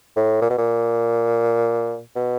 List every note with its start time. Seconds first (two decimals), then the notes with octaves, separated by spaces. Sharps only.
0.16 A2
0.42 A#2
0.50 B2
0.58 A#2
2.16 B2